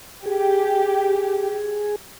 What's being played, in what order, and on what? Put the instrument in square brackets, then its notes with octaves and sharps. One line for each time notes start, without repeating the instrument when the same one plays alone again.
[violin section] G4 [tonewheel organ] G#4